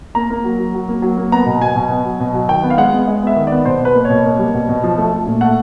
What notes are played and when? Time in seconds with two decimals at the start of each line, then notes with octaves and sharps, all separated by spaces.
0.15 A#3 A#5
0.30 A#3
0.44 F#3
0.59 F#3
0.74 F#3
0.89 A#3
1.02 F#3
1.18 A#3
1.32 B3 A#5
1.46 B2
1.61 F#3 G#5
1.76 B2
1.90 B3
2.04 F#3
2.20 B2
2.34 F#3
2.48 D#3 G5
2.63 B3
2.70 F5
2.78 G#3 F#5
2.93 B3
3.08 G#3
3.23 B3 E5
3.36 D#3
3.47 B3 D5
3.65 B2 C5
3.81 B2 B4
3.95 A#3
4.05 B2 C#5
4.25 A#3
4.39 G3
4.54 B2
4.69 B2
4.84 F3
4.98 A3
5.13 A3
5.26 A#2
5.41 A3 F#5